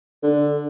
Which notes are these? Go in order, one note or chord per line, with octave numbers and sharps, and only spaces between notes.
D3